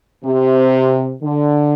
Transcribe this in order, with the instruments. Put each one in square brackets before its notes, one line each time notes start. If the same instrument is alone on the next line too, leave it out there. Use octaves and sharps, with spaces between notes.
[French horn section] C3
D3